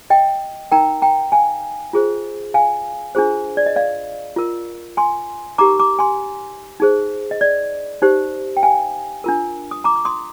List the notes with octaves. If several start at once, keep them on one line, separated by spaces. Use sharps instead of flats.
D#5 G5
D#4 A#4 G5 A#5
G5 A#5
F5 G#5
F4 G#4 C5
F5 G#5
D4 F4 G#4 C5
D5
D#5
D5 F5
F4 A#4
G#5 C6
D#4 G4 A#4 A#5 D6
A#5 D6
G#5 C6
D#4 G#4 C5
D#5
D5
D#4 G4 C5
G5
F5 G#5
D4 F4 A#4
D#6
A#5 D6
D6
C6 D#6